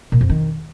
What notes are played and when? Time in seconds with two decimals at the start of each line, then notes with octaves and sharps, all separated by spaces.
0.12 A#2
0.21 F2
0.29 D#3